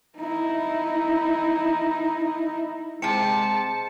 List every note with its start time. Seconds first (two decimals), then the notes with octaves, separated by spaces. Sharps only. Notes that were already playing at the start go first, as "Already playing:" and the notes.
0.18 D#4 E4
3.02 C3 G#3 C4 A5 C#7